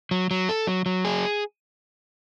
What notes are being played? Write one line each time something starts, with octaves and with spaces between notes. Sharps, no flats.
F#3
F#3
A4
F#3
F#3
G#4